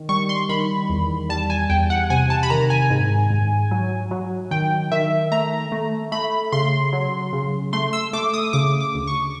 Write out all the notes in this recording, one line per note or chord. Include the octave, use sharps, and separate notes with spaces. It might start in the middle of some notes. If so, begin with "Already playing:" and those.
Already playing: D#3
G3 C#6
C6
D#3 B5
E2
G3 A5
G#5
E2 G5
F#5
C3 G#5
A5
B5
D#3 A#5
G#5
G#2
G#2
F#3
F#3
D#3 G5
D#3 E5
A3 A#5
A3
A3 B5
C#3 C6
F#3
C#3
A3 C6
E6
A3 D6
D#6
C#3 D6
D6
D2
C#6